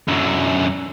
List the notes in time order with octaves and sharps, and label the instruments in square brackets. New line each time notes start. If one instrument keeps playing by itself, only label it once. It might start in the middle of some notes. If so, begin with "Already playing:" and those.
[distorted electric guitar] F#2 D3